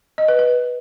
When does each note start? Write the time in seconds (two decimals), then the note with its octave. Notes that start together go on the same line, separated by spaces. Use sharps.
0.18 D#5
0.28 B4
0.39 B4